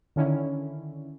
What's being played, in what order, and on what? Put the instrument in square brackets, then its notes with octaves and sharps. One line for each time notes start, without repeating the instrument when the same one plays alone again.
[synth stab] D3 D#3 C#4 E4